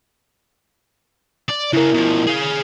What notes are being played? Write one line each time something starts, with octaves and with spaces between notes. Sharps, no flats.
D5
C#3 A#3 E4 A#4
B2 F3
G#4 F5